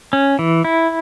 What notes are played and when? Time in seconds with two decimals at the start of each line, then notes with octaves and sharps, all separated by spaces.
0.13 C#4
0.39 E3
0.64 E4